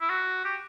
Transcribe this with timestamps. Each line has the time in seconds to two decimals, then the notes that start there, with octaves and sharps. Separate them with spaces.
0.01 E4
0.10 F#4
0.45 G4